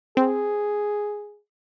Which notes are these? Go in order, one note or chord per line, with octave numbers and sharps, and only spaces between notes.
C4 G#4